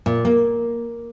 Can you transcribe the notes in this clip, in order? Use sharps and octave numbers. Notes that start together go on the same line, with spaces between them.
A#2
A#3